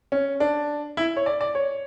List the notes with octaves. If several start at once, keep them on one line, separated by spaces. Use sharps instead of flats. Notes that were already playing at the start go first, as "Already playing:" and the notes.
C#4
D4
E4
C#5
D5
D5
C#5